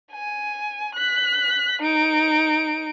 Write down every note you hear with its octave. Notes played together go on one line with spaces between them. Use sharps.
G#5
F#6 B6
D#4 D7